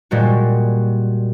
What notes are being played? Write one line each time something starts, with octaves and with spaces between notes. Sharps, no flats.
A#2 G3 G#3 F#4